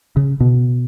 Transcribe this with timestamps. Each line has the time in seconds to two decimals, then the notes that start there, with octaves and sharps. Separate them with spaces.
0.17 C#3
0.40 B2